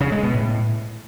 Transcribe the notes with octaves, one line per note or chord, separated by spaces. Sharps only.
C#3
G#3
B2
A2